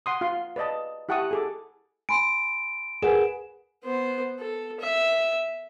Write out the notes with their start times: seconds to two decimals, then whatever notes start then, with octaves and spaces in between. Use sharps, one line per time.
0.06 F#5 C6 D#6
0.21 F4 F5 C6
0.56 B4 D5 D#5 A5
1.09 E4 G4 F#5 A5 C#6 D#6
1.31 G#4 A4 D6
2.09 G#5 B5 C6 D7
3.02 G#4 A#4 B4 F#5 G#5 E7
3.84 B3 C5
4.39 A4
4.80 E5